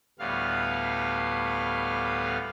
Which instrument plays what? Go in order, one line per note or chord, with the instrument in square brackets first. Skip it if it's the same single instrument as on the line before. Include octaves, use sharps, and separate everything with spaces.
[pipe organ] D2 A2 G3 B3 F5